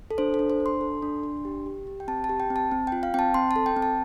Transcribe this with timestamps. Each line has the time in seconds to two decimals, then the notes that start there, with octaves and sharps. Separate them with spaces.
0.11 A4
0.18 D4 C5
0.34 A4
0.39 D4
0.50 C5
0.60 D4
0.66 C6
0.81 A4
1.02 D4
1.23 D4
1.45 G4
1.66 G4
1.87 G4
2.00 G5
2.08 C4 A5
2.24 A5
2.29 G4
2.40 G5
2.50 C4
2.56 A5
2.71 C4
2.87 G5
2.92 F4
3.03 F5
3.14 C4 G5
3.19 A5
3.34 C4 C6
3.51 A5
3.56 A4
3.66 G5
3.77 C4
3.82 A5